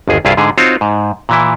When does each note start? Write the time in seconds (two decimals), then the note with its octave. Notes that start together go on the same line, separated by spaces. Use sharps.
0.08 G1 D#2 G#4
0.25 C2 G2 E4 F4 G#4 F5
0.37 G#2 D3 G#4
0.58 C4 D#4 F4 F#4 C5 C#5
0.81 G#2
1.29 A#2 E3 E4